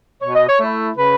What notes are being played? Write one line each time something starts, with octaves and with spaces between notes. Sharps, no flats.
B2 C#5
D#5
C#5
A3 E4
C#3 B4